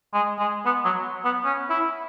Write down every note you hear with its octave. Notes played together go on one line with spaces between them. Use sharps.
G#3
G#3
B3
F#3
B3
C#4
E4